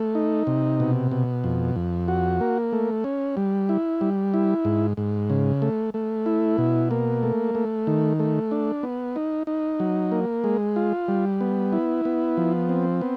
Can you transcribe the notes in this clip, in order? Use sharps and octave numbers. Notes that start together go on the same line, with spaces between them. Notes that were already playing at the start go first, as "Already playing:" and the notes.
Already playing: A3
D#4
C3
B2
B2
F2
F2
F#4
A#3
A3
C#4
G3
E4
G3
E4
G#2
G#2
C#3
A3
A3
E4
B2
A#3
A3
A3
D#3
A3
D4
B3
D#4
D#4
F#3
A#3
G#3
F4
G3
B3
E4
B3
F3
C4
B3